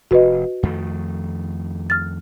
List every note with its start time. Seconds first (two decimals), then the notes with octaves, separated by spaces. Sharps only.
0.11 F1 F#4 B4 D#5
0.63 F2 D#3 A3
1.90 F6 A6